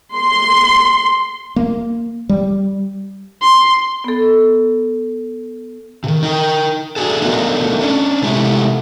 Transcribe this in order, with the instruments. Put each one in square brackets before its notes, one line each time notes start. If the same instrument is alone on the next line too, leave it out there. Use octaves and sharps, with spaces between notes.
[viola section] C6
[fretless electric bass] A#3
G3
[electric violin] C6
[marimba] B3 A4
[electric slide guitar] C3 D#3
D#4 A#4 G5
D4 F#4 G#4 A4
A3 B3 D4 D#4 F4 A#4
C#4 D4
C3 G#3 A3 E4 G4